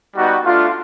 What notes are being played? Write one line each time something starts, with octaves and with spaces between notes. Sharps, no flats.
G3 B3 D#4 F#4
A3 D4 F4